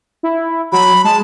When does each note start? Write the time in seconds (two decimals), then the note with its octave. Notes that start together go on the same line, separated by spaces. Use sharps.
0.23 E4
0.72 F#3 B5
1.04 G#3 A5